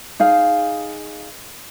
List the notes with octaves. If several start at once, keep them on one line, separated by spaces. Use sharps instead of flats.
D#4 G#4 F5